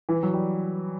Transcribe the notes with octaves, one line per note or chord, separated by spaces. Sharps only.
E3
F#3
G3